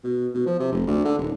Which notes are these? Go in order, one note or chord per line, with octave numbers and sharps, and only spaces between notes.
B2
B2
F3
C3
F1
D2
D3
D#1